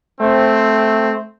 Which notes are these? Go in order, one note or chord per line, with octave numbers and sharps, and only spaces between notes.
A3 C4